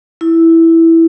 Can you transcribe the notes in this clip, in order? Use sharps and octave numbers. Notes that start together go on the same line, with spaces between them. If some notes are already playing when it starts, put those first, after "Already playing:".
E4